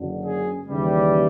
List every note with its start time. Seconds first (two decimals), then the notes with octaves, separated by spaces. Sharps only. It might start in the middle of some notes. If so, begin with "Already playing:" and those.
Already playing: F#1 F#2 D3
0.26 G#4
0.66 D#2 C#3 E3 G3